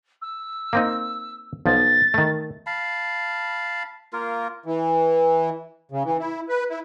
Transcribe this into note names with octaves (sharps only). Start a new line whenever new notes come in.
E6
A#3 C4 D#4
B1 F3 A6
D#3 A3
F5 A5 B5
A#3 F4 A#4
E3
C#3
E3
E4
B4
E4